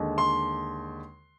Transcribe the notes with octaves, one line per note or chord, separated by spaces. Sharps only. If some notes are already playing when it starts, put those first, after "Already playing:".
Already playing: D#2 D3 G#3
C6